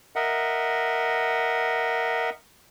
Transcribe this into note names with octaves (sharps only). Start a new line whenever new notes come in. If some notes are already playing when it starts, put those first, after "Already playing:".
A#4 D#5 E5 F#5